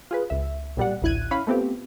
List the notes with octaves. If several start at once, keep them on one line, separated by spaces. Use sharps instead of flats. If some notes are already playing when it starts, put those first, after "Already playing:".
F4 G#4 B4
C#2 E5
B1 A#2 G3 D5 F#5
A1 D2 E4 F#6 G#6 D#7
C#4 E4 C#5 F5 B5
A3 B3 C4 F4 G4